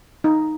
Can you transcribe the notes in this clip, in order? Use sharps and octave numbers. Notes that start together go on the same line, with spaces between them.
D#4